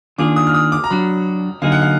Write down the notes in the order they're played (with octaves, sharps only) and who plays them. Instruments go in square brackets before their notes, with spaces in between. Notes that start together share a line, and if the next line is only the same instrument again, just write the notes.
[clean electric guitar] D#3 A#3 D4 F4 G#4 [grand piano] D6
[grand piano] D#6
F6
D#6
D6
A#5
[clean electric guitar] F#3 D4 F#4 [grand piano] B5
[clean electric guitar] D3 F#3 A#3 D#4 G#4 [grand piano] F5
[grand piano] F#5
F5